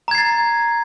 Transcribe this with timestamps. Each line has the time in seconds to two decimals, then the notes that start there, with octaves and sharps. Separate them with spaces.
0.08 A#5
0.11 G#6
0.15 C7
0.18 A6